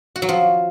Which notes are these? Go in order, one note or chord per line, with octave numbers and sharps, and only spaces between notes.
F#4
F#3
F3